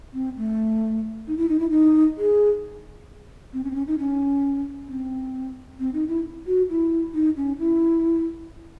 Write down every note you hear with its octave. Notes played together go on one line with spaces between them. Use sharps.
C4
A3
D#4
E4
D#4
E4
D#4
G#4
C4
C#4
C4
C#4
D#4
C#4
C4
C4
D#4
E4
F#4
E4
D#4
C#4
E4